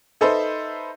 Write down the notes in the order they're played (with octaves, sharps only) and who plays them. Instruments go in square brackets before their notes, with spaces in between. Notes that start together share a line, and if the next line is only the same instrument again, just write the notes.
[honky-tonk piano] D#4 A4 B4 C5 E5